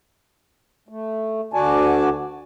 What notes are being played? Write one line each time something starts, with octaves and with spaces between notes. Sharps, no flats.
A3
D2 D3 F#4 D5 G#5 A5